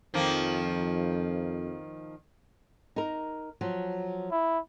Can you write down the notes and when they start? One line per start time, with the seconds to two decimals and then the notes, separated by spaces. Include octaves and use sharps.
0.14 F2 D#3 F3 A#3
2.96 D#4 A#4
3.61 F3 F#3
4.32 E4